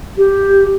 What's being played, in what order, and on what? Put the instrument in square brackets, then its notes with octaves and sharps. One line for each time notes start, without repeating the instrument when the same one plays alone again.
[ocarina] G4